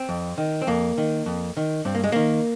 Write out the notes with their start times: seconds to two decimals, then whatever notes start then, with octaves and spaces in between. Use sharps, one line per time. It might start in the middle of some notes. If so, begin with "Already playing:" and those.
Already playing: C4
0.09 F2
0.38 D#3
0.62 C4
0.67 F2 A#3
0.98 D#3
1.26 F2
1.57 D#3
1.85 G2 C4
1.95 A#3
2.04 G#3
2.12 D#3 A#3